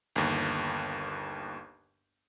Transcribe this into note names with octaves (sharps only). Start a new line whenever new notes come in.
G1 D#2